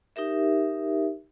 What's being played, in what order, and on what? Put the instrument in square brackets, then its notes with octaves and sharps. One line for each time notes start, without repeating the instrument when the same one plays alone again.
[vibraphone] D#4 G4 A#4 E5